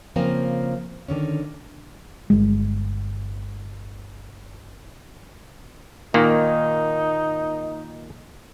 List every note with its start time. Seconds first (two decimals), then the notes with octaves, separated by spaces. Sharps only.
0.16 C#3 F3 A#3 C4 A#4 G#5
1.08 D3 D#3 C#4
2.30 G1 G#3
6.14 A#2 D#3 A#3 D#4